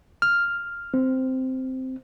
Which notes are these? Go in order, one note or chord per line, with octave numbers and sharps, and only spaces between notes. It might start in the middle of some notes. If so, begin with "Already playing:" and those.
F6
C4